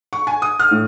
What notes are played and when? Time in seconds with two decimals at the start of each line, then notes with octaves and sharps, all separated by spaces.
0.13 C#6
0.27 G#5
0.42 D#6
0.59 F6
0.71 A2